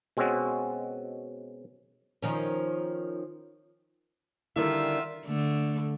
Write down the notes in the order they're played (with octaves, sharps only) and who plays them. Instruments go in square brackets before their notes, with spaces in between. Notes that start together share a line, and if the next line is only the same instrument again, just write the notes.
[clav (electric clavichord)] B2 G#3 C4 C#4 F#4
[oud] D#3 F3 C#4
[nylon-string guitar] D3 D#3 G3 [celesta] E4 E6 [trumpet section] F4 E5
[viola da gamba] D3 A3